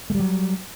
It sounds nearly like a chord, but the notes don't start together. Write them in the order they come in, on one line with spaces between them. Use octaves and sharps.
A3 G3 F#3